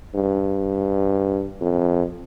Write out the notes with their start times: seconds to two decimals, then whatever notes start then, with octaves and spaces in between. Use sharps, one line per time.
0.15 G2
1.61 F2